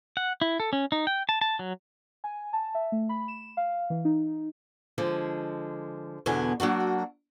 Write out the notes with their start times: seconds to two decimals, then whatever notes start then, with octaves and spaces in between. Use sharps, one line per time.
0.17 F#5
0.41 E4
0.60 A4
0.73 C#4
0.92 D#4
1.07 G5
1.29 A5
1.41 A5
1.59 F#3
2.24 G#5
2.53 A5
2.75 E5
2.92 A3
3.09 B5
3.28 E7
3.57 F5
3.90 E3
4.05 D#4
4.98 D3 F3 G#3
6.26 E2 B2 D3 B3 G#5
6.60 F#3 A#3 D4 F#4